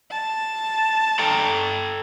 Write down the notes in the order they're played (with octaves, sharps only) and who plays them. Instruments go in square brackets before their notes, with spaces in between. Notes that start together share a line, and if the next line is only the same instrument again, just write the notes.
[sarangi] A5
[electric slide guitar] A4 G5 A#5